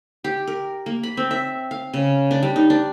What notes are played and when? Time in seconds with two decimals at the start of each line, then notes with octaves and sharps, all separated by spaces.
0.24 G4
0.47 A#4
0.86 A#3
1.03 B5
1.17 C4
1.31 E5
1.71 F5
1.94 C#3
2.31 D4
2.43 G3
2.56 D#4
2.70 D4